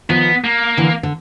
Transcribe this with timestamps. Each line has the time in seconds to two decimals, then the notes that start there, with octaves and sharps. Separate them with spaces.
0.09 D#3 F3 B3
0.44 A#3
0.77 D3 E3
1.03 D3